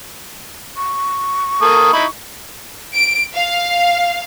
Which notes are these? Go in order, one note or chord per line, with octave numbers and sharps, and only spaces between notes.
C#6
A#3 A4 D#6
D#4 E4 B5
D7
F5